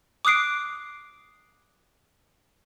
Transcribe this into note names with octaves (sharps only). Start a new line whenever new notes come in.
D6 D#6 F#6 C7 D7